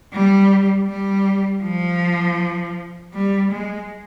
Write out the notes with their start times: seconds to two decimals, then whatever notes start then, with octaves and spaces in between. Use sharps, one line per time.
0.13 G3
0.87 G3
1.63 F3
3.14 G3
3.52 G#3